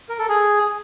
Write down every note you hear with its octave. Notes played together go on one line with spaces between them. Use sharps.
A#4
A4
G#4